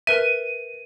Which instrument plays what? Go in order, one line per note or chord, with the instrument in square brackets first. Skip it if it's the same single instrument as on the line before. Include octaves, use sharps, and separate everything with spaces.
[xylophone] A#4 B4 E5 [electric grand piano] D#7